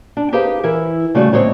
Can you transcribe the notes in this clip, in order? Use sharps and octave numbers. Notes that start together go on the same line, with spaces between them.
D4
D#4 G4 G#4 B4 C5 F5
E3 E4 A#4
C#3 G3 A3 C#4 F#4 G#4
D#2 A2 G#3 C4 C5 C#5